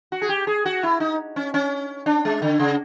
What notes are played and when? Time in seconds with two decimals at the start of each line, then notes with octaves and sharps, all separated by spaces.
0.12 F#4
0.22 G#4
0.29 G4
0.47 G#4
0.66 F#4
0.83 E4
1.00 D#4
1.36 C#4
1.54 C#4
2.06 D4
2.25 G#3
2.42 D3
2.59 C#3